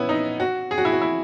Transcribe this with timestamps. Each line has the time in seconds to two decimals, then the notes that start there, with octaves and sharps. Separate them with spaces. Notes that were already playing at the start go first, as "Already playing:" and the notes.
Already playing: B3 C#4 E4
0.09 D#4
0.40 F#4
0.71 G#4
0.78 F#4
0.85 E4
0.92 F#4
1.02 E4